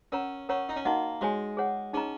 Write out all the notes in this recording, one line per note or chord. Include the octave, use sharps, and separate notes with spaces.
C#4 A#4 C#5 F#5 A#5
C#4 A#4 C#5 F#5 A#5 C#6
D#4
C#4
A#3 D#4 F#4 D#5 F#5
G#3 F#4 C#5 G#5
G#4 C#5 F#5
C#4 D#4 G#4 D#5 A#5